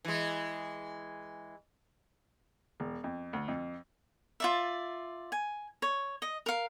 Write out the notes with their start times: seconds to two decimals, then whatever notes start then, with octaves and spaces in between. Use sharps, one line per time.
0.05 E3 G#3
2.80 E1
3.04 F2
3.33 D2
3.48 F2
4.40 F4 D5 E5
5.32 G#5
5.82 C#5
6.22 D#5
6.46 A#4 F5